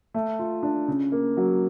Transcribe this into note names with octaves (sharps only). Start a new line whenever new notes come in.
A3
F4
D4
C#3
A#3
F#3